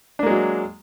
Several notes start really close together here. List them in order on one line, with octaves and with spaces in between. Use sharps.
D4 A#3 G#3 F#3